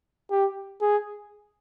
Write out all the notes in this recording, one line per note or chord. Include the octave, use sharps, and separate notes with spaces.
G4
G#4